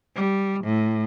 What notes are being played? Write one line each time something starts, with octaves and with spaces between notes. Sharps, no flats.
G3
A2